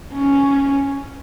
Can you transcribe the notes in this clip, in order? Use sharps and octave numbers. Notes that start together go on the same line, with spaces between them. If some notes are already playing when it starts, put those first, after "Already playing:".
C#4